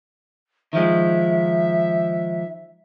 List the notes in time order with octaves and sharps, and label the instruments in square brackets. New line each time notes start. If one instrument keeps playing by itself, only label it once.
[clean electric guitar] D#3 F3 G#3 [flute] E5